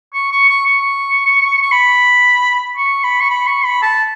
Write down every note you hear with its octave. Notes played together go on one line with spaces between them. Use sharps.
C#6
C#6
C#6
C#6
C#6
B5
C#6
B5
C#6
B5
C#6
B5
A5